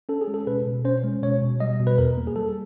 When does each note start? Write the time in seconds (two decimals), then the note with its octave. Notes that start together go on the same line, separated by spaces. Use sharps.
0.09 C#4 A4
0.21 G#4
0.28 G#3
0.34 A4
0.47 B2 B4
0.66 B2
0.84 C#4 C5
1.04 G#3
1.23 B2 C#5
1.42 B2
1.60 G3 D#5
1.79 B2
1.87 B4
1.98 E2 A#4
2.17 A#3
2.27 G#4
2.36 G3 A4